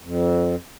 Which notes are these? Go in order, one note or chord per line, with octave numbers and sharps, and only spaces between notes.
F2